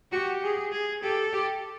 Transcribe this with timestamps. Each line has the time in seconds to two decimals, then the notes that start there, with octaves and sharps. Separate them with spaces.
0.12 F#4 G4
0.43 G#4
0.72 G#4
1.03 G4 A4
1.33 G4